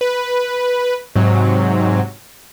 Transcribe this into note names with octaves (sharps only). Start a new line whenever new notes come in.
B4
G#2 C3 F#3